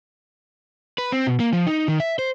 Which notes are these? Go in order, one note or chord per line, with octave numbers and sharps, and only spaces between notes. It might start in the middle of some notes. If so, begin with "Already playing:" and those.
B4
C4
B2
A#3
F3
D#4
D#3
E5
C5